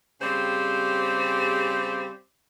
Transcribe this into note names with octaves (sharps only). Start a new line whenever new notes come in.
C#3 G3 C4 G4 G#4 C5